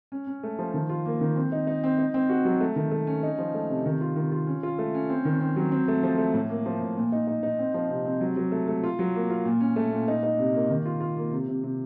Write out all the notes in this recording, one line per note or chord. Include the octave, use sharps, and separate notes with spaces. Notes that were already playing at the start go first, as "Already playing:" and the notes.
C#4
C#4
A3
F3
D#3
F4
A#3
D#3
C4
D#4
D#4
C4
D#4
C4
F#4
F#3
A3
D#3
A3
C#4
D#4
F3
A3
C3
D#3
F4
D#3
F4
C#4
F4
A3
C#4
C4
D#3
C4
F#3
C4
A3
F3
A3
A2
A#3
F3
A2
A#2
D#4
D#4
D#4
C4
F3
C3
C4
F#3
F#3
A3
A3
F4
F#3
A#3
F4
A#2
C#4
A3
A#2
D#4
D#4
C3
A#3
D#3
F4
F4
A#3
C3
C3
C3